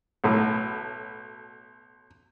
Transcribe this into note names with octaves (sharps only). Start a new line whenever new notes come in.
B1 A2